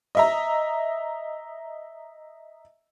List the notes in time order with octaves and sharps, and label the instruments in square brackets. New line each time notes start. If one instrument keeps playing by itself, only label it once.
[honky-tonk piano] D#5 E5 A#5